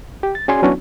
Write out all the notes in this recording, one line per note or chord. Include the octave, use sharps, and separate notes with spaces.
G4
A6
C#4 F#4 G#4 D5 G#5 C6
F#3 B3 C#4 D4 E4 F#4